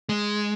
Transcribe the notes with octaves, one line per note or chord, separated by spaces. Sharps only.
G#3